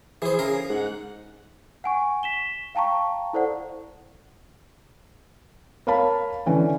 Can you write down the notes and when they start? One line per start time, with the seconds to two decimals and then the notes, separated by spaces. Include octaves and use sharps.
0.22 E3 G#4 C5
0.39 C#3 A#4
0.70 G#2 F#5
1.84 F#5 G#5 C#6
2.23 B6 E7 G7
2.75 F5 G5 A5 A#5 C#6
3.33 E4 A4 C5 D5 F#5
5.87 A#4 C#5 F5 A5 B5
6.46 D3 E3 C#4